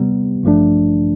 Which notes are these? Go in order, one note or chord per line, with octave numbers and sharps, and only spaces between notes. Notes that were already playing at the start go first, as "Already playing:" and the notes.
Already playing: C3 G3 B3
A1 G2 F3 A3 D4